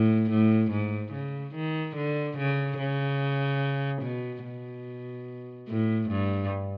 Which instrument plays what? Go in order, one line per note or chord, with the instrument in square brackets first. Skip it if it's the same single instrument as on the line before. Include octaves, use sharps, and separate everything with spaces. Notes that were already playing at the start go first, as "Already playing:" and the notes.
Already playing: [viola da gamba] A2
A2
G#2
C#3
D#3
D3
C#3
C#3
B2
B2
A2
G2